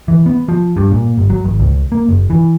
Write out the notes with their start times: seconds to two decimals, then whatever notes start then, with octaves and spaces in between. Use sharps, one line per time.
0.08 E3
0.26 B3
0.48 F3
0.76 G2
0.91 A#2
1.18 G1
1.30 F#3
1.45 G#1
1.60 C#2
1.92 A#3
2.09 F#1
2.30 E3